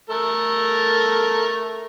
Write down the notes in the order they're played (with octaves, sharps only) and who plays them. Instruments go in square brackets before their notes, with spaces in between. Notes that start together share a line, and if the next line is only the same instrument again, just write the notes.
[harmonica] A3 A4 A#4